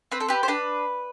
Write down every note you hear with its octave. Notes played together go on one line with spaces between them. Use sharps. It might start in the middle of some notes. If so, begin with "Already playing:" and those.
C4 B4
A4
G4 B4
C5
D4 B4